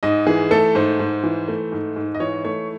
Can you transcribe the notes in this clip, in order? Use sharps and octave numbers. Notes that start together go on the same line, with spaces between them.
G#2 D#5
E3 G#4
A3 A4
G#2 C5
G#2
E3
A3
G#2
G#2
D#5
E3 C#5
A3 C#5